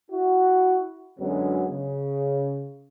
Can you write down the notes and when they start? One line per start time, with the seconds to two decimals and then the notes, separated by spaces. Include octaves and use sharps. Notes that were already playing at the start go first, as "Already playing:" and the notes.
0.11 E4 F#4
1.19 F#2 D3 F#3 G#3 B3 C#4
1.70 C#3